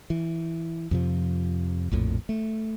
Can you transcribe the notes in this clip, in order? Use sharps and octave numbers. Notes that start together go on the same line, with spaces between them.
E3
F2 C3 F3
A#1 F2 A2
A3